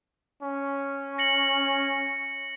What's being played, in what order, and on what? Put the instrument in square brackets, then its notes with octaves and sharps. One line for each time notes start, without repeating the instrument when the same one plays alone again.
[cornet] C#4
[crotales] A#6 C#7 F#7